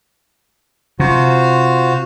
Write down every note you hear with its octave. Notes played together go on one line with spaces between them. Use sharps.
C3 F4 F#4 C5